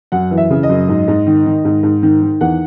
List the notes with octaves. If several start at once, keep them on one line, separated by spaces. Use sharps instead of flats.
F#2 F#5
E3
E5
C#3
D#5
F#2
G#2
G#2
D#3
D#3
G#2
G#2
D#3
D#3
E2 F#5